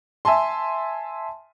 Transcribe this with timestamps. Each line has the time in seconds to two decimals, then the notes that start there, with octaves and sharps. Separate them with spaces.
0.25 E5 G#5 A5 C6